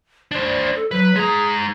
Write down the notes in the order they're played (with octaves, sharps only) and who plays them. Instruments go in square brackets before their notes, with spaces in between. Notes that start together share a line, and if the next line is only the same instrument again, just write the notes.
[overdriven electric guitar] D4 C5 [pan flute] D5
[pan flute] A4
[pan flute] F#3 [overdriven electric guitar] B4
[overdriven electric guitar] G#3 A#5 [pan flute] G#4